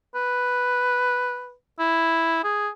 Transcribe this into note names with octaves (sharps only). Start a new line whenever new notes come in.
B4
E4
G#4